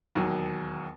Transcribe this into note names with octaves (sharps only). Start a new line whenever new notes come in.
E1 D#2 D#3 F#3